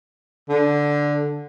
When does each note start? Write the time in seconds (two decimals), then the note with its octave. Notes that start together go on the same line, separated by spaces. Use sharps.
0.49 D3